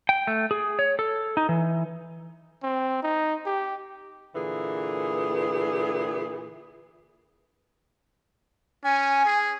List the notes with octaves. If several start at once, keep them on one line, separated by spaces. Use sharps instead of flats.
G5
A3
G#4
C#5
A4
D#4
E3
C4
D#4
G4
A#2 D3 E3 G#4
C#4 G#5
G#4